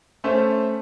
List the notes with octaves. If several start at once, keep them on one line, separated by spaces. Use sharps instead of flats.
A3 C#4 C5 E5 A5